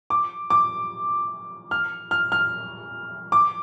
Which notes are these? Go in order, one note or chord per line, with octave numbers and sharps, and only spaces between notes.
D6
D6
F6
F6
F6
D6